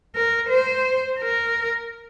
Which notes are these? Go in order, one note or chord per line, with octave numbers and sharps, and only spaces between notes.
A#4
C5
A#4